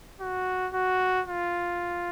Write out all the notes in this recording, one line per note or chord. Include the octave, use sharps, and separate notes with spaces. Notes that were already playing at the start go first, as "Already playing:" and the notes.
F#4
F#4
F4